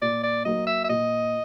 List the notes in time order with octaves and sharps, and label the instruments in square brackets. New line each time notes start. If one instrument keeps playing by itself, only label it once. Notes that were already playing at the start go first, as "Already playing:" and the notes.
[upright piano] A#2 [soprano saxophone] D5
[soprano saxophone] D5
[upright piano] F#3 A#3 [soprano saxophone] D#5
[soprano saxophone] E5
E5
[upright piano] A#2 [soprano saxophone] D#5